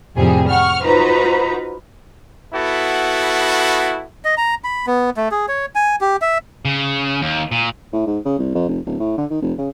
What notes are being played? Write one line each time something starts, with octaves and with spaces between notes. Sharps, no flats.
F2 A2 C3 F3 G3 G#4
F#5 C#6 F6
D#4 F4 F#4 B4 C5 A#5
B3 E4 F#4 A4
D#5
A#5
B5
B3
A3
G#4
C#5
G#5
G4
E5
C#3
D#2
A#2
A2
G#2
C#3
C2
F2
F1
D1
A2
D3
D#3
F1
C#3